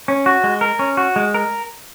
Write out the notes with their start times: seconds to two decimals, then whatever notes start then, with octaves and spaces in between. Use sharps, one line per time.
0.08 C#4
0.26 F#4
0.44 G#3
0.61 A#4
0.79 C#4
0.97 F#4
1.16 G#3
1.34 A#4